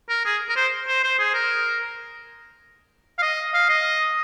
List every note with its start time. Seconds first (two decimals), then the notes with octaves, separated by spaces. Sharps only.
0.09 A#4
0.25 G#4
0.49 A#4
0.56 C5
0.88 C5
1.03 C5
1.19 G#4
1.34 A#4
3.18 F5
3.22 D#5
3.54 F5
3.69 D#5